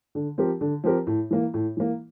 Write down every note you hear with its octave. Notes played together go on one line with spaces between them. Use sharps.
D3
F3 C4 G4 A#4
D3
F3 C4 G4 A#4
A2
E3 A#3
A2
E3 A#3